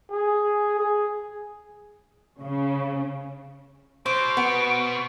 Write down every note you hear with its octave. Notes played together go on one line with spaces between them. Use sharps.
G#4
G#4
C#3
B2 C5 D7
B3